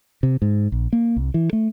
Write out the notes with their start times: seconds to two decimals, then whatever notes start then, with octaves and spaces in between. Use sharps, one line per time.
0.23 C3
0.42 G#2
0.72 A#1
0.93 A#3
1.16 C2
1.34 E3
1.53 A3